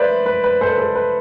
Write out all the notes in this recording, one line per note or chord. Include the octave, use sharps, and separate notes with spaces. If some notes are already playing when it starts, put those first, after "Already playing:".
Already playing: B4 C5 D5 E5
B4
B4
A4 C5
B4
A4
B4